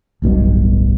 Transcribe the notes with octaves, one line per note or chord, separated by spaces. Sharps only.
D1 B1 G2 B2